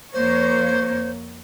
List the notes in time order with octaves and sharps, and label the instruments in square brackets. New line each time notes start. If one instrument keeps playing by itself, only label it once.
[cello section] F2 A#3 C#5 [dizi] C5